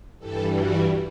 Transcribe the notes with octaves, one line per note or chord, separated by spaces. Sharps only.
G2 E3 G3 A4
F#4